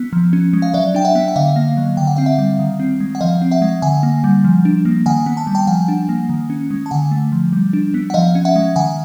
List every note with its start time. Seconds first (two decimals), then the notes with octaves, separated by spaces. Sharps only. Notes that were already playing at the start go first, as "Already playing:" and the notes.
Already playing: B3
0.13 F3
0.33 C#4
0.53 G#3
0.62 F5
0.74 F#3 D5 E5
0.95 D4 G5
1.05 E5 F#5
1.15 B3
1.28 F#5
1.36 D3 D#5 F5
1.56 A#3
1.77 F#3
1.97 D3 G5
2.07 F#5
2.16 C4 F5
2.26 E5 F#5
2.38 G3
2.59 D#3
2.80 C4
3.00 G#3
3.15 F#5
3.21 F3 D#5 F5
3.42 C4
3.51 E5 F#5
3.62 G#3
3.82 D3 F#5 G#5
4.03 A#3
4.24 G3
4.44 F3
4.65 D4
4.85 A#3
5.06 D#3 F#5 G#5
5.26 B3
5.37 A5
5.47 G3
5.55 G5 A5
5.67 F3 F#5 G#5
5.88 D4
6.09 A#3
6.29 D#3
6.50 C#4
6.71 G#3
6.86 A5
6.91 D3 F#5 G#5
7.11 A3
7.32 F3
7.53 G3
7.73 D4
7.94 B3
8.10 F#5
8.14 F3 D#5 F5
8.35 C#4
8.45 E5 F#5
8.56 G#3
8.76 D#3 F#5 G#5